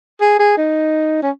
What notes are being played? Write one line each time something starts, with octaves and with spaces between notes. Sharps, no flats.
G#4
G#4
D#4
C#4